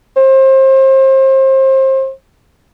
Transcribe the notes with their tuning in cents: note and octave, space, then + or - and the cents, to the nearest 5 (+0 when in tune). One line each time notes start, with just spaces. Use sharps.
C5 +30